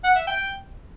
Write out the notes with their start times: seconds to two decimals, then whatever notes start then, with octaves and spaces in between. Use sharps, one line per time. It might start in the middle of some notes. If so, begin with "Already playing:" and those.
0.04 F#5
0.16 E5
0.27 G5